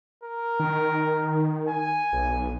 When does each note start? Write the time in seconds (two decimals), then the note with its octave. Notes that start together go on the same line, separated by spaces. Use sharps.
0.23 A#4
0.59 D#3
1.68 G#5
2.13 B1